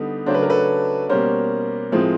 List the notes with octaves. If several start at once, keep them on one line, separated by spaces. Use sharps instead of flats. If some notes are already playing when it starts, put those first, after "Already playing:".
Already playing: D3 G3 B3 D#4
C#3 F#3 A3 D4 C5
B4
A#4
A4 B4
B2 G3 A#3 C#4 A#4 C5
A2 F3 G#3 C4